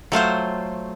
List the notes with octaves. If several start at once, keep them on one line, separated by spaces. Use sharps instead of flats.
F#3 A3 F4 C5